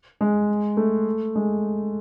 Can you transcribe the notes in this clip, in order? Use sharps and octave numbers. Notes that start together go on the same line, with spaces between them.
G#3
A3
G#3